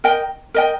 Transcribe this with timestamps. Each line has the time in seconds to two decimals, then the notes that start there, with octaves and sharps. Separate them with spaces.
0.04 A#4 D#5 G5
0.54 A#4 D#5 G5